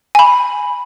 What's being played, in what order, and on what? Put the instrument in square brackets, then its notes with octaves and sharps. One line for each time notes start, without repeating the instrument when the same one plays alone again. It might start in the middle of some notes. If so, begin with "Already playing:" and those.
[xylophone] G#5 B5